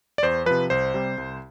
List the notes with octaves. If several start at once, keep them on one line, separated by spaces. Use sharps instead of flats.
D5
E2 C5
C3 F3 B4
C2 C5
C3 G3
C2